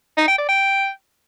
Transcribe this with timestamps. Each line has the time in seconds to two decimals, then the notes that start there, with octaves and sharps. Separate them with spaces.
0.18 D#4
0.28 G5
0.38 D5
0.49 G5